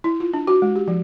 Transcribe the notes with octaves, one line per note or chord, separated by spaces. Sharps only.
E4
F4
D4
F#4
G#3
G4
F3